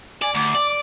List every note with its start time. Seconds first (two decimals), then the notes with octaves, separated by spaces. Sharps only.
0.22 D5 G#5
0.35 D2 D6
0.55 D5